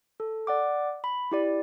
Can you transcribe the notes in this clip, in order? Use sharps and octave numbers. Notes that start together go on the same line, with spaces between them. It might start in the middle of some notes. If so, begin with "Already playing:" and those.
A4
D5 F#5 D6
B5
E4 G4 D5